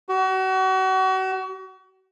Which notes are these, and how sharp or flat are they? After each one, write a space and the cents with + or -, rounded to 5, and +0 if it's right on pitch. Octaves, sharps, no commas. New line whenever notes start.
F#4 +35